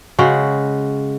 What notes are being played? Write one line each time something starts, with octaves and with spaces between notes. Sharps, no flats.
C#3 G#3 F#4